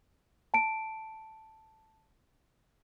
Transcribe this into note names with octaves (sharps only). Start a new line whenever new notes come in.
A5 D7